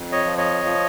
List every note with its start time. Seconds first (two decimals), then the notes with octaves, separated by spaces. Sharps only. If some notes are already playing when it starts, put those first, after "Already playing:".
Already playing: F2
0.12 C#5 D#5
0.25 F3
0.38 C#5 D#5
0.65 F3